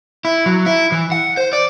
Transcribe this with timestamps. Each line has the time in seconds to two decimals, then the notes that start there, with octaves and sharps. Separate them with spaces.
0.25 E4
0.46 F#3
0.66 E4
0.92 E3
1.12 F#5
1.37 C5
1.53 D5